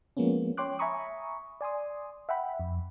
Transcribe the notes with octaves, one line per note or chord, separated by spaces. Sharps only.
F3 G#3 A#3 B3 C#4
C#5 G5 C6 D6 F#6
E5 G#5 A#5 B5 C#6 D#6
D5 G#5 C6 D#6
E5 F#5 G5 B5
F2